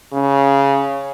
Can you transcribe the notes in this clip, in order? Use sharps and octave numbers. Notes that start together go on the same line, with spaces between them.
C#3